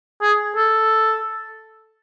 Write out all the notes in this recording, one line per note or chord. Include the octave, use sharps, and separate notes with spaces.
G#4
A4